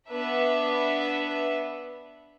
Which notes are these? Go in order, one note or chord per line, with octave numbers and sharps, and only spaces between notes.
B3 D4 B4 E5